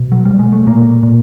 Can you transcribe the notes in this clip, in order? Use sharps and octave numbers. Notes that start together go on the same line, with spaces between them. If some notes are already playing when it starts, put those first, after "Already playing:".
Already playing: B2
F#3
B2 G3
G#3
A3
A#2 A#3
A#2